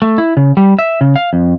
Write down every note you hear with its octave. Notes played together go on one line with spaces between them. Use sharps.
A3
E4
C#3
G3
E5
C#3
F5
F2